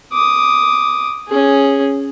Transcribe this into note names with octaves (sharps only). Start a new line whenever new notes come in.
D6 D#6
C#4 G#4